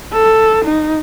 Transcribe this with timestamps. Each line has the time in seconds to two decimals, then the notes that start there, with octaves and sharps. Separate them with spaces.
0.12 A4
0.65 D#4